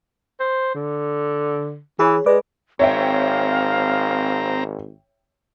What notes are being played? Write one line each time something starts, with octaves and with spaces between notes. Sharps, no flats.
C5
D3
E3 G#4 C#5
G#3 B4 D5 D6
G#1 C4 C#5 E5 F5 G5 A#5